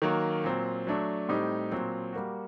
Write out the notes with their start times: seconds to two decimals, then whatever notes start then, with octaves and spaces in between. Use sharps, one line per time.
0.02 D#3 F#3 A#3
0.44 A#2 F#3 C4
0.87 F#3 A3 D4
1.29 A2 G3 C4 D#4 G4
1.71 A#2 F#3 C4
2.13 G3 A#3 F#4